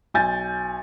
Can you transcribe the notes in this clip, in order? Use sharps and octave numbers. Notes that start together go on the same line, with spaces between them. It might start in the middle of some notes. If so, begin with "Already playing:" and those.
B1 G#5 G6 A6